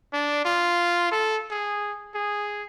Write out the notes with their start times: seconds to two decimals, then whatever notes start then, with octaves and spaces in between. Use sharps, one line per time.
0.13 D4
0.45 F4
1.12 A4
1.51 G#4
2.14 G#4